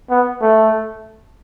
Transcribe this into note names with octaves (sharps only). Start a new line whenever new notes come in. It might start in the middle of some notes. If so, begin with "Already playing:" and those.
B3
A3